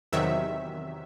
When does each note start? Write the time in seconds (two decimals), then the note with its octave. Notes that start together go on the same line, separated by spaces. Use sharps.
0.12 E2 C3 D#3 F#3 E5